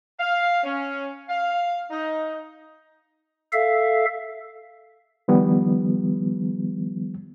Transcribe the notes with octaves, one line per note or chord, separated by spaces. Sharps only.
F5
C#4
F5
D#4
A4 E5 F5
D#3 F3 G3 B3